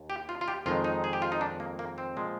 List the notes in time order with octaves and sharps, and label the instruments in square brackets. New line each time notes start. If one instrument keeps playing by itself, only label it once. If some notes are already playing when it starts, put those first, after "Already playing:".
Already playing: [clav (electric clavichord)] D#2
G4
F4
F4
G4
F2 D#3 G#3 F4
D#4
G#4
G4
F4
D#4
D4
A#3
A#3
C4
A#2 F3 G#3